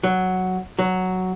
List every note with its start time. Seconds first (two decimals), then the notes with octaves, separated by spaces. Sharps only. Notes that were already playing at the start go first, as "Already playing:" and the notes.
0.03 F#3
0.79 F#3